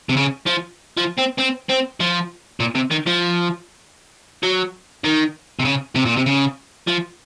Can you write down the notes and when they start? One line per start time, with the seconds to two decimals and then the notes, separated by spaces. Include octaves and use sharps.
0.09 C3
0.17 C#3
0.47 F3
0.97 F3
1.18 C4
1.38 C4
1.69 C4
2.00 F3
2.60 A#2
2.75 C3
2.91 D#3
3.07 F3
4.43 F#3
5.04 D#3
5.59 C3
5.65 C#3
5.95 C3
6.05 A#2
6.16 C3
6.26 C#3
6.88 F3